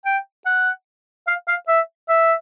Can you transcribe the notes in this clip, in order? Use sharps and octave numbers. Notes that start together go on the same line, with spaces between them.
G5
F#5
F5
F5
E5
E5